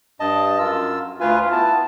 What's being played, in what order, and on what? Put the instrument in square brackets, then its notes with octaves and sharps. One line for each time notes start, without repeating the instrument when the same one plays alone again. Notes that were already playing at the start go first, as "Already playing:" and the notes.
[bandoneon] G2 D#5 A5
F#2 F4 E6
[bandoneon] D2 B4 G#5 [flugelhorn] F4
[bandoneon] B3 E4 [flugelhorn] A5